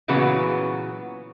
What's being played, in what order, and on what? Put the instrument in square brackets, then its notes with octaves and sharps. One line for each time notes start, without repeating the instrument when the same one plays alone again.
[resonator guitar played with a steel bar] A#2 C#3 E3 F#3 B3